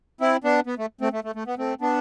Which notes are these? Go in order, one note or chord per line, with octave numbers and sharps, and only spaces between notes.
C4 E4
B3 D4
B3
A3
A3 C4
A3
A3
A3
B3
A3 C4
B3 D4